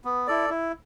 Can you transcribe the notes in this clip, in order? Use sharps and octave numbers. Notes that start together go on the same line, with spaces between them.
B3
E4 A4 D5
E4